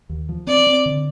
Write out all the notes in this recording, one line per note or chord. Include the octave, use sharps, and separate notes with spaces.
D#2
F3
C4 D5
C4
D3